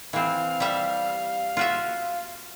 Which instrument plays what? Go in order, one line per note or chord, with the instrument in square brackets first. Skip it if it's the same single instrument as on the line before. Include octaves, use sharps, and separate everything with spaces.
[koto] E3 C4 [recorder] F5
[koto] G3 E5
F4 F#4 E5